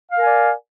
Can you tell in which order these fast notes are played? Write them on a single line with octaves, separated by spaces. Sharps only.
F5 A#4 G#5 D5